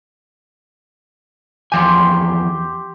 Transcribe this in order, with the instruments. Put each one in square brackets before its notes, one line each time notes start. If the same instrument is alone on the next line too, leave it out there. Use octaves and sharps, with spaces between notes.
[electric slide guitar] E2 F3 G#5 [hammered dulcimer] G4 C6